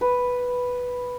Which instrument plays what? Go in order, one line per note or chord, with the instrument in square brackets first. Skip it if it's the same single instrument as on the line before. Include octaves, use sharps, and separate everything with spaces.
[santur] B4